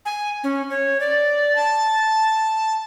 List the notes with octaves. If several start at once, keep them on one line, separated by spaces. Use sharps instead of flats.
G#5
C#4
C#5
D5
A5